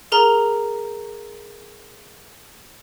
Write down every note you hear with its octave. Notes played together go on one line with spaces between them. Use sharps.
G#4 A#4 A#5